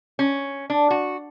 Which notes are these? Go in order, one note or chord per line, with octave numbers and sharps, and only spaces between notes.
C#4
D4
F#4